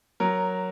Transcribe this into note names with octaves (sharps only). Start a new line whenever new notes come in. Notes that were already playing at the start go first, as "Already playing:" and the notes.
F#3 A#4